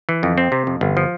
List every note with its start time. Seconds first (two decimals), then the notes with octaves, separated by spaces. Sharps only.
0.09 E3
0.23 F2
0.38 C4
0.52 C3
0.67 F2
0.81 G1
0.97 F3